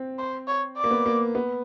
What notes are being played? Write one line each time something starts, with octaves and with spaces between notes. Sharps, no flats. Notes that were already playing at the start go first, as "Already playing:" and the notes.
Already playing: C4
C5
C#5
D5
A#3
B3
A#3
B3